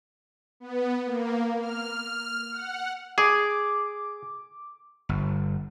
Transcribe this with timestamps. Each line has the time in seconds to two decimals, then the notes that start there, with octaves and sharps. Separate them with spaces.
0.60 B3
1.06 A#3
1.59 F6
2.52 F#5
3.18 G#4 D6
5.09 G1